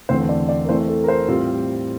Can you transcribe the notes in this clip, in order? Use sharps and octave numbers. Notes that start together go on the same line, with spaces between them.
E2 D3 A3 C4 C5
D5
D5
A#4
E3 A3 C4 C5
A4
A#4
C5
A2 G3 C4 F4